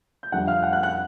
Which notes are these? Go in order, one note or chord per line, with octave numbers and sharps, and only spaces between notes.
G6
F2 D3 G3 F#5 F#6
F5 F6
F#5 F#6
F#5 F#6
F#5 F#6